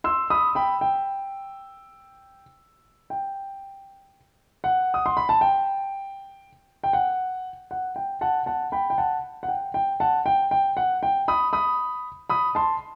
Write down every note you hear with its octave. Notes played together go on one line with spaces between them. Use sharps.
C6 E6
B5 D#6
G5 B5
G5
G5
F#5
D#6
C6
B5
A5
G5
G5
F#5
F#5
G5
F#5 A5
F#5 A5
G5 B5
G5
F#5 A5
F#5
G5
G5
F#5 A5
G5
G5
F#5
G5
B5 D#6
B5 D#6
B5 D#6
A5 C6